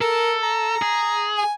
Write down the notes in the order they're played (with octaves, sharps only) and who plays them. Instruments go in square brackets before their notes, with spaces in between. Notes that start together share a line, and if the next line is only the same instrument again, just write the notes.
[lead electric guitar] A4 [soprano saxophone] A#4
[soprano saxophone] A#5
[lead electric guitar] G#4
[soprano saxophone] G#5